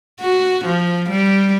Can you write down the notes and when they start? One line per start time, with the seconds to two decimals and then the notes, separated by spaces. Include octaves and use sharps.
0.20 F#4
0.65 F3
1.09 G3